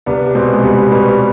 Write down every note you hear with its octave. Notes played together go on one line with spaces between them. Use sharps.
C2 B3 D4
B2 G#3 C4
G#3
C2 G3 B3
B2 G3 B3